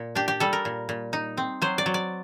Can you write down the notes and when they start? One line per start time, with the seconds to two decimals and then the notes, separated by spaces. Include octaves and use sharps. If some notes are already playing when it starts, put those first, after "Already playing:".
Already playing: A#2
0.15 D4 G4
0.28 G4
0.40 G3 A4
0.53 A#4
0.65 A#2
0.89 A#2
1.13 D#4
1.37 C4
1.62 F#3 C5
1.78 D5
1.86 F#3
1.94 D5